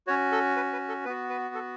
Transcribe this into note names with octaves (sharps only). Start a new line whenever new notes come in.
C#4 F#4 C#5
A4
B4
B4
A4
B3 F#4 B4
B4
A4